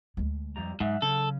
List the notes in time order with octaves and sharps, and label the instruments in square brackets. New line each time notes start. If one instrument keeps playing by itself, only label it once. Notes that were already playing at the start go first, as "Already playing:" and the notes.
[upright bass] D2 G#3
[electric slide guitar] F2 G3 A#5
[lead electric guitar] G#2 [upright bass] F#3 [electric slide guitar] E5 F#5
[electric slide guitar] C#3 C#4 [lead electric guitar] A4